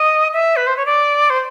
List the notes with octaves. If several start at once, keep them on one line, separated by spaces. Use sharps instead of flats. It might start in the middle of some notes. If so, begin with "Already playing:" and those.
Already playing: D#5
E5
B4
C5
C#5
D5
C5